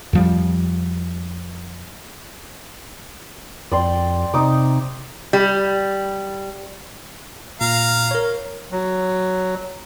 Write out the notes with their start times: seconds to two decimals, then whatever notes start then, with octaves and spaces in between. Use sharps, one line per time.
0.13 F2 F3 G3
3.71 F2 D5 G5 C6
4.34 C3 D#4 D6
5.33 G3
7.61 A#2 F5 A#5
8.11 A#4 C#5
8.72 F#3